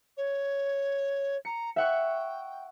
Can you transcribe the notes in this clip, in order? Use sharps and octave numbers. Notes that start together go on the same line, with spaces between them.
C#5
A#5 C#7
E5 F#5 G5 C#6